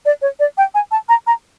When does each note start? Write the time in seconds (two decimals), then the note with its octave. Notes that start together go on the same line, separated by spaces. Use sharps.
0.05 D5
0.22 C#5
0.40 D5
0.57 G5
0.74 G#5
0.91 A5
1.09 A#5
1.27 A#5